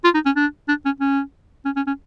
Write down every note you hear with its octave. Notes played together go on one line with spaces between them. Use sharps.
F4
D#4
C#4
D4
D4
C#4
C#4
C#4
C#4
C#4